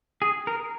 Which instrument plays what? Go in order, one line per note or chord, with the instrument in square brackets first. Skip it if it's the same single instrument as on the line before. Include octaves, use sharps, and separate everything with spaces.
[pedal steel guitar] G#4
A#4